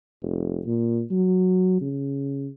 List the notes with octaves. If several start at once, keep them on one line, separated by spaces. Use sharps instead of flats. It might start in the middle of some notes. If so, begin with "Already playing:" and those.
F1
A#2
F#3
C#3